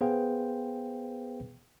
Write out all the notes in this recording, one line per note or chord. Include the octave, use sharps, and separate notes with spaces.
B3 G#4 B4 C5 F5 G5